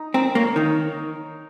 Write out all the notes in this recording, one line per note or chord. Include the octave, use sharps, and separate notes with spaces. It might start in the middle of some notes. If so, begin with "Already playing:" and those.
Already playing: D#4
C4 A#4
A#3 C#5
D#3 D#4